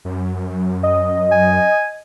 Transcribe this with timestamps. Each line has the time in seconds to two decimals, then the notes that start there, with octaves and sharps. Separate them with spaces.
0.05 F#2
0.83 D#5
1.32 G#5